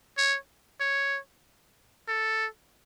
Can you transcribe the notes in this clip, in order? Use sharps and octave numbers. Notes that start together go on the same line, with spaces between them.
C#5
C#5
A4